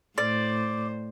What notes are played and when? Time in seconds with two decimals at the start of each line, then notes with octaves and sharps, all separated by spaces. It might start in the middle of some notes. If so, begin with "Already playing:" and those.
0.18 A2 C5 D5